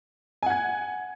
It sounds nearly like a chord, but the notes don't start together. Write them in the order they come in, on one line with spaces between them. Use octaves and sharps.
G#5 F#5 G#6